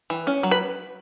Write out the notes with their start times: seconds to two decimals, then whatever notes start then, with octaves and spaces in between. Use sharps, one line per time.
0.10 E3
0.27 C#4
0.43 F#3
0.51 B4